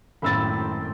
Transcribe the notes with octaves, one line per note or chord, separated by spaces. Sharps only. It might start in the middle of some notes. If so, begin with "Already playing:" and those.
G#1 F#2 A2 C4 B5 C6 E6 A6